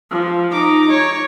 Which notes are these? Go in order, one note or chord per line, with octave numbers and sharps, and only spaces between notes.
F3
D#4 D6
C#5